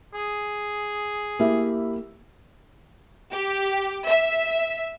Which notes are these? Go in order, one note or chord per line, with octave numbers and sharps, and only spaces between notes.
G#4
A#3 E4 G4 E5
G4
E5